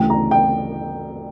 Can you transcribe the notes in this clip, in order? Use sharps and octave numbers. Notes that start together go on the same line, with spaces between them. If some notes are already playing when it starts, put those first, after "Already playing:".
Already playing: D2 C#3 E3 A3 G5
A#5
G5